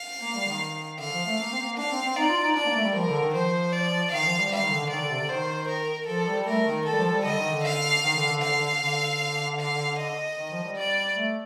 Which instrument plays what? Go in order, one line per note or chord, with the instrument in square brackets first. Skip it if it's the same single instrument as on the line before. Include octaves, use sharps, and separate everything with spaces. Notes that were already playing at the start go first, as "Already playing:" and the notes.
Already playing: [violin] F5
[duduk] A#3
G3
D#3
[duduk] D3 [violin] F5
[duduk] F3
A3
A#3
C4
A#3
[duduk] D4 [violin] F5
[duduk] C4
C4
[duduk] D#4 [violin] D5
[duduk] F4
D#4
[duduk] D4 [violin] D5
[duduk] A#3
A3
G3
[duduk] F3 [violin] A#4
[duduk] D3
D#3
[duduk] F3 [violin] C5
[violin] D5
[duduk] D#3 [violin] F5
[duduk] F3
G3
[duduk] G3 [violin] F5
[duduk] D#3
D3
D3
[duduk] D#3 [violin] D5
[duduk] D3
C3
D3
[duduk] D#3 [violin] C5
[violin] A#4
[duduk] F3 [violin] A4
[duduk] G3
[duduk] A3 [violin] A#4
[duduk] D#3
[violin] A4
[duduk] G3
F3
G3
[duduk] D3 [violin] D#5
[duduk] D#3
D3
[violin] F5
[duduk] D#3
D3
D3
[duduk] D3 [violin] F5
[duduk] D3
D3
[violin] F5
D#5
[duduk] D#3
F3
G3
[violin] D5
[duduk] A3